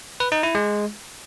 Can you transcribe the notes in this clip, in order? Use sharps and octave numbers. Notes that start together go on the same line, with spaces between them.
B4
D#4
E4
G#3